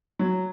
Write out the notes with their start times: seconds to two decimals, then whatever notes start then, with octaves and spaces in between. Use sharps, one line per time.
0.19 F#3